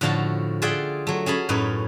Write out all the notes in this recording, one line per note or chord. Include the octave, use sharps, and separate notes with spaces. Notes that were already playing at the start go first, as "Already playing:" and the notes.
A2 D3 F3 F#4 F5 A5
F4 G#4 D5 E5 F#5 G5
F#3 A3
C#4 G#4 A5 B5
F#2 A2 D#4 B4